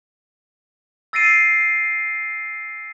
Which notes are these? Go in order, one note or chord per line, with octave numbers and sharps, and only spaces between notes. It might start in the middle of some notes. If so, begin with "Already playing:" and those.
E6 A6 A#6 C7 D7 D#7